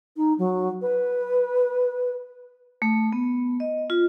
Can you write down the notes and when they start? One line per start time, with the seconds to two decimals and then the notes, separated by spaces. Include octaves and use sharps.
0.16 D#4
0.38 F#3
0.82 B4
2.82 A3
3.12 B3
3.60 D#5
3.90 F4